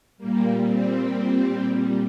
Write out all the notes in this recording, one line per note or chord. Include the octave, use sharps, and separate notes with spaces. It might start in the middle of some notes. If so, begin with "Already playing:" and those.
A#2 G3 A#3
C4